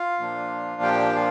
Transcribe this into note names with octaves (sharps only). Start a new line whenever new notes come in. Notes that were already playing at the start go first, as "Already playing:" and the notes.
Already playing: F4 F5
A#2 F3 A#3 D4
G4 G5
F4 F5